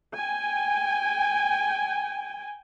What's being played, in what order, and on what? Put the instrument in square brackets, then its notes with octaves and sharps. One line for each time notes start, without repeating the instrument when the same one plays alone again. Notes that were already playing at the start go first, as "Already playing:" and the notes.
[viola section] G5 G#5